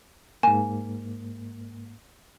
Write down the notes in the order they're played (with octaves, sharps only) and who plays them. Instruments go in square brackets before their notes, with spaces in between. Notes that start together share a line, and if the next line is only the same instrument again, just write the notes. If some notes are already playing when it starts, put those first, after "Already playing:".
[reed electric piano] G#2 A#3 [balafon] G#5